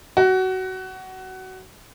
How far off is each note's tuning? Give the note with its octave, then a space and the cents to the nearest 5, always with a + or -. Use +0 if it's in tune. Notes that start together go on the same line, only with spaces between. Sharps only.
F#4 +20